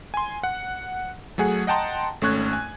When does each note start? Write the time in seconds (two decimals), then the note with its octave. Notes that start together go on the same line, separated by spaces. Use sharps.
0.14 G#5 C6
0.43 F#5
1.38 F#3 A3 G#4 F#5
1.67 D#5 F#5 G5 A5 A#5 C6
2.21 G#1 A3 C#4 C#6 F#6 G#6
2.53 G#5